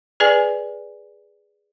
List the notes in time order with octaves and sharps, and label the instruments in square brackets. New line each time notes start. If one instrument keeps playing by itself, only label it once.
[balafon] G#4 B4 D5 G#5